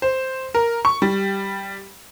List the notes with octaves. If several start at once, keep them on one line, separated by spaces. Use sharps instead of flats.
C5
A#4
C#6
G3